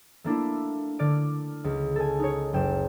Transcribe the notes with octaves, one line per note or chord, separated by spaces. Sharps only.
A3 A#3 D4 E4
D3 D5 F6 D7
C#2
A4 G#5
D#4 C#5
F#1 G5 E7